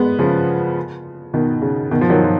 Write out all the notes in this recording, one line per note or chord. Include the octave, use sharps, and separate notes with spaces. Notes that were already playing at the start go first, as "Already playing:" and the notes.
Already playing: G#3 B3
C#3 F3
B2 D#3
C#3
B2 D#3
F3
D#3 F#3
F3